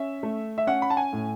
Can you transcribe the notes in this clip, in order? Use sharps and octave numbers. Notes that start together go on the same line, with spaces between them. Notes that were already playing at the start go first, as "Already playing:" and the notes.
Already playing: C#4 E5
A3
E5
C#4 F#5
B5
A5
G#5
A2